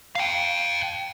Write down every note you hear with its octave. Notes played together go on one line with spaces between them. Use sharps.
F5 G5